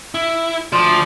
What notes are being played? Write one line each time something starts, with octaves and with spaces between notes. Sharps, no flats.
E4
D2 F3 D5